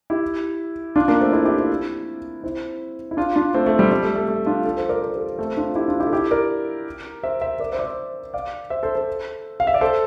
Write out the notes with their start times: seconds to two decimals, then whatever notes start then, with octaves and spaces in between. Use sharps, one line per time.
0.10 E4 G4
0.96 D4 F4
1.08 A#3 D4
1.20 A3 C4
1.33 C4 E4
1.45 E4 G4
1.57 C4 E4
2.44 C4 E4
3.11 E4
3.17 D4 F4
3.36 D4 F4
3.54 A3 C4
3.66 A3
3.79 G3
3.91 G3
4.03 A3
4.15 A3
4.28 A3
4.46 D4 F4
4.65 F4 A4
4.77 A4 C5
4.89 A#4 D5
5.02 A4 C5
5.15 G4 A#4
5.38 A3 C4
5.57 D4 F4
5.75 E4 G4
5.88 D4 F4
6.00 E4 G4
6.07 A4
6.13 E4 G4
6.31 A#4 D5
7.23 C5 E5
7.41 C5 E5
7.60 A#4 D5
7.72 C5 E5
7.79 D5
7.84 C5 E5
8.34 D5 F5
8.70 C5 E5
8.83 A4 C5
8.95 A4 C5
9.60 F5
9.67 E5
9.74 D5
9.81 A4 C5